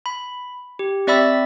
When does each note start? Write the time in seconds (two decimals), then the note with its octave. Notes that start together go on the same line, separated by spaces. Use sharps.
0.06 B5
0.79 G4
1.07 C4 D5 E5 B5 E6 A6